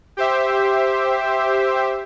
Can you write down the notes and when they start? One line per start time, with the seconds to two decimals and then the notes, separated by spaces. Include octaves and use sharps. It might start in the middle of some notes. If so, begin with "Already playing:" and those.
0.17 G4 C5 E5